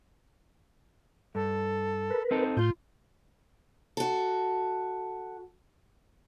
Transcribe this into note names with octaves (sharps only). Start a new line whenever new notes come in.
G2 A4
A#4 B4
C4 D#4 A4
A2 F4 G6
F#4 A4